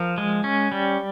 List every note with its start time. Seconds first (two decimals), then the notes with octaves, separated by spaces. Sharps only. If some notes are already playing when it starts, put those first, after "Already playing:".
Already playing: F3 A#4
0.18 G#3
0.44 C#4
0.72 G3